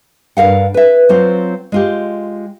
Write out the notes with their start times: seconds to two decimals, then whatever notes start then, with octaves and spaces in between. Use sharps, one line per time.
0.37 G2 A#4 F5 F#5
0.74 B4 E5
1.09 F#3 C4 F4 C5
1.72 G#3 F4 G4